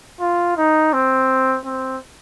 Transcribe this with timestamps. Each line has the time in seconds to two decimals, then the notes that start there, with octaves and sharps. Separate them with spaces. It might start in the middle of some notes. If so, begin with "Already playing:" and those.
0.21 F4
0.57 D#4
0.93 C4
1.65 C4